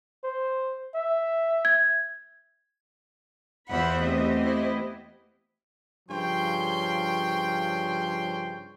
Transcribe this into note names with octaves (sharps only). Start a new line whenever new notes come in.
C5
E5
G#6
E2 F4 C5 E5 F#5 B5
A3 B3 C4 G4 D#5
E4
G2 C#3 F3 C#5 G5 C6